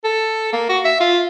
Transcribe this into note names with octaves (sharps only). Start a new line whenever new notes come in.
A4
A#3
F#4
E5
F4